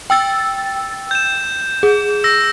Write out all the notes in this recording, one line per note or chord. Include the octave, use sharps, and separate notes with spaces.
G5 E6 A6
G6 E7
G#4
E6 A#6